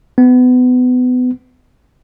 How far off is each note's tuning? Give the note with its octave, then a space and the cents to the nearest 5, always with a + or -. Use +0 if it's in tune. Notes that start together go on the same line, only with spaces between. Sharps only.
B3 +25